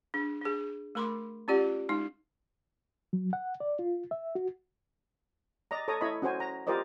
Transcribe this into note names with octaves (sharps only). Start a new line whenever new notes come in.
D4 G#4
D4 G#4
A3 A#4 B5 C6 D6
C#4 F4 G4 D5 F#5
G#3 D#4
F#3
F#5
D5
F4
E5
F#4
D5 D#5 A#5
A4 C#5 A#5 D#6
E4 C#5 D#5 B5
C#4 F#4 C5 G#5
A#5
F4 G4 A#4 C5 D5 D#5